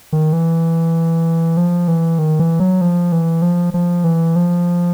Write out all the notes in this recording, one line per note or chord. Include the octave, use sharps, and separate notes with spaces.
D#3
E3
F3
E3
D#3
E3
F#3
F3
E3
F3
F3
E3
F3